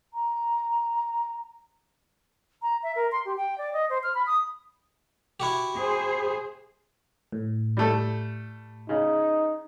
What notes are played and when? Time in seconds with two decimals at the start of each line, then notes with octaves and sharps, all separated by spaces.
0.13 A#5
2.62 A#5
2.83 E5
2.96 A#4
3.12 C6
3.25 G4
3.37 G5
3.58 D5
3.73 D#5
3.90 C5
4.03 F6
4.15 B5
4.27 D#6
5.40 E4 F#4 G4
5.77 G#4 C5
7.32 A2
7.77 G3 A3 A4
8.89 C#3 D#4